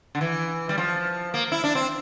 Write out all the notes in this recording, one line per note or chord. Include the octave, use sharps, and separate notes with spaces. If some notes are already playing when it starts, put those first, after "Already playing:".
D3
E3
G3
F3
A#3
E4
D4
C4